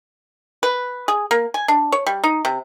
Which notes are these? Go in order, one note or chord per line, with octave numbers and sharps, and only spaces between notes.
B4
G#4
A#3
G#5
D4
C#5
G3
D#4
C3